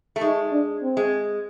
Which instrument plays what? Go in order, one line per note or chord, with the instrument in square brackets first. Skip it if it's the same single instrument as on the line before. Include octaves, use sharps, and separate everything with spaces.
[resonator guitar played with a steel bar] A3
[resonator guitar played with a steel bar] G#3 [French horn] D#4
[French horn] D4
C4
[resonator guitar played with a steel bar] G#3